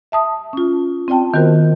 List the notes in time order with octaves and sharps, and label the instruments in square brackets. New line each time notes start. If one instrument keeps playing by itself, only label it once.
[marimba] E5 A5 D#6
C#4 F4
C4 F4 D5 G5 A5
D#3 B3 F4 F#4 A#4 C5